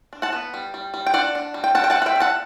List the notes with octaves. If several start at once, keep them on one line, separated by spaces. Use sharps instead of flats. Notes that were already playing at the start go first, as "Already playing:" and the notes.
D4
F#5 A5
B3
G3
G3
G3
G5
D4 D5 F#5
D4
G3
G5
G3 F#5 A5
G5
F#5 A5
G3
F#5
E5 G5
D4
F#5 A5